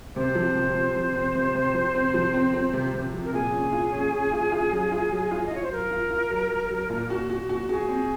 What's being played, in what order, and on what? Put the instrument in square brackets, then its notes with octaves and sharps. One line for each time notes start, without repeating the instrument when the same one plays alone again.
[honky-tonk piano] C3 [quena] C5
[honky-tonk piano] F3
C3
C3
F3
C4
C3
C3
F3
C4
F3
C4
C4
C3
C3
F3
[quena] A#4
[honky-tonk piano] A#2 [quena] G#4
[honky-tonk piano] C#4
F4
C#4
C#4
F4
F4
F#3
F4
F#3
F4
[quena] D#5
[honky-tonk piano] F4 [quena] C#5
[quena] C5
[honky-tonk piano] F#3 [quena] A#4
[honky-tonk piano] F4
F4
F#3
F#3
F#3
A#2
F#4
F#4
F#4
[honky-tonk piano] F#4 [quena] G#4
[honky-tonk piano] C4